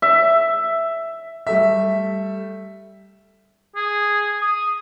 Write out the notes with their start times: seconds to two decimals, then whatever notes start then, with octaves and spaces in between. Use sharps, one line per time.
0.02 E5
1.47 G3 A3 E5
3.76 G#4
4.42 D#6